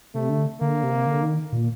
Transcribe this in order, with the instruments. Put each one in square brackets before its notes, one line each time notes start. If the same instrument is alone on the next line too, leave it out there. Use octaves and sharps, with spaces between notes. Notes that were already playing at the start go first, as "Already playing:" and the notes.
[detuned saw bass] C3 [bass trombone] A3
[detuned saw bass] D3
[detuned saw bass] D3 [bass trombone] A#3
[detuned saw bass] C3
D3
D#3
A#2